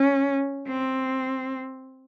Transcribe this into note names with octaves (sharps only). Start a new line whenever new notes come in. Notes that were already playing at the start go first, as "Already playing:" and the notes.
Already playing: C#4
C4